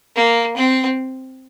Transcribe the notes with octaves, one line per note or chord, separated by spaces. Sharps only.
A#3
C4